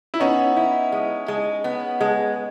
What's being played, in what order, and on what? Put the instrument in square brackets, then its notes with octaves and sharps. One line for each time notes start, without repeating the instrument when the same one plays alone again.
[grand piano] E4
[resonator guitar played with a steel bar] B3 [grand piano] C#4 D#4
[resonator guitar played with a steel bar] E4
G#3
G#3
B3
G#3